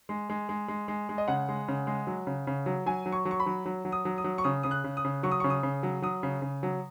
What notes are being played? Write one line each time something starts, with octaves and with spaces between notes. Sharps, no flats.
G#3
G#3
G#3
G#3
G#3
G#3
D#5
C#3 F#5
G#3
C#3
G#3
F#3
C#3
C#3
F#3
F#3 G#5
F#3
C#6
F#3
C#6
B5
F#3
F#3
F#3
D#6
F#3
D#6
F#3
C#6
C#3 D#6
C#3 D#6
F#6
C#3
D#6
C#3
F#3 C#6
D#6
C#3 C#6
D#6
C#3
F#3
F#3 D#6
C#3
C#3
F#3